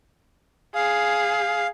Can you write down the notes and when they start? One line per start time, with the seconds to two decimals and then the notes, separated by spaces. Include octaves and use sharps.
0.75 G#4 F5